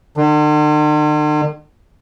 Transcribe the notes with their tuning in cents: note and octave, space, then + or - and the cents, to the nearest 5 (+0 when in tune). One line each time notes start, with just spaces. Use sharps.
D3 +45